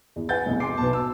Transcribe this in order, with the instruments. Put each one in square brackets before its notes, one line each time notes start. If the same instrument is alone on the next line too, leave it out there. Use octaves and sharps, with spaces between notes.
[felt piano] E2
[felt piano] B4 F#5 G#5 [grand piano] G6 A6
[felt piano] F1 B1 E2
[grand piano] G#5 D6 [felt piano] C6 C7
[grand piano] B1 A5 [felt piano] B3 B4
[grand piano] E6